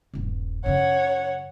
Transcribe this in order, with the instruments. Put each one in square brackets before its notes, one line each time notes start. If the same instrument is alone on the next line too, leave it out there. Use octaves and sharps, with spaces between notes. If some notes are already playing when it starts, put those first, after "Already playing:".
[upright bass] D#1 G2
[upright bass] F#2 C#3 [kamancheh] C#5 F#5